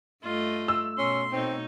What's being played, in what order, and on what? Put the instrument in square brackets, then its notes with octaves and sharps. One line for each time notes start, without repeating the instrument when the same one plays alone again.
[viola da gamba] G2 A3 [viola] F4 D#5
[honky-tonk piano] E6
[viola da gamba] B2 [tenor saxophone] C#4 [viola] C6
[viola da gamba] B2 A3 C#5 [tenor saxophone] C4 [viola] D#4